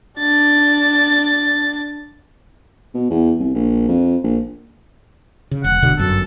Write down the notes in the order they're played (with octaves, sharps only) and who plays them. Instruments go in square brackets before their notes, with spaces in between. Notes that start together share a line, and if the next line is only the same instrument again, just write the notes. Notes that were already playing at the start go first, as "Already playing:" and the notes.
[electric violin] D4 A6
[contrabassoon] B2
E2
C2
A#1
F2
A#1
[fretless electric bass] C#3
[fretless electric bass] E1 [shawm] F#5
[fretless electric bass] E1 B2 D3
[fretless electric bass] G1 F#2 [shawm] A4